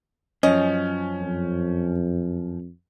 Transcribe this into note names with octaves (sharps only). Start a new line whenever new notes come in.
F#2 F3 C#4 D#5
F2